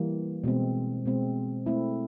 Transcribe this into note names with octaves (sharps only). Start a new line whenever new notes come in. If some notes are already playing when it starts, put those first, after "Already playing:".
Already playing: E3 G3 A#3
B2 G#3 C4
B2 G#3 C4
A3 C4 E4